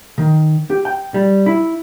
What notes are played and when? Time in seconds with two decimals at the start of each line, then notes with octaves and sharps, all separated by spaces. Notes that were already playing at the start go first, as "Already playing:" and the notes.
0.18 D#3
0.70 G4
0.85 G5
1.14 G3
1.46 E4